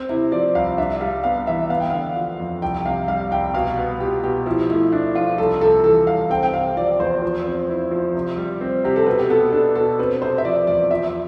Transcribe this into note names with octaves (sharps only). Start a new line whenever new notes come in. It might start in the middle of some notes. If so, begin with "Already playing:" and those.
Already playing: C4
C3 E4
F3 D5
C2 F5
D4 E5
G3 F5
B3 F5
E3 E5
B3 F5
G5
D3 F5
F3
F2
C2 G5
C3 F5
G3 F5
C2 G5
B2 F5
B3
F4 G4
B2 G4
F3 E4
A3 E4
D4 E4
F3 F4
C2 A4
C3 A4
E3 A4
C2 F5
C4 G5
G5
C3 F5
F3 D5
E2 C5
F3
C4
E4
F3
C3
G3
C4
C3 G4
A4
B2 B4
G4
B3 A4
D4 A4
B2 A4
C4 B4
C3 C5
E5
F3 D5
E2 D5
F3 E5